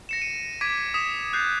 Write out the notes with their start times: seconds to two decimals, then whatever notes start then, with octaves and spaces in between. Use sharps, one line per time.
0.09 A#6 C#7 E7
0.22 D#7
0.61 D6 G#6 B6 D7 D#7
0.94 D#6 B6 E7
1.33 F#6 G6 A6 C7